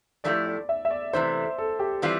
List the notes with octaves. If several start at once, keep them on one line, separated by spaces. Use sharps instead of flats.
A2 F3 A3 E4 G4 D5
D5
E5
E5
D5
C3 E3 A3 C5
A4
G4
E3 G3 C4 F4 D5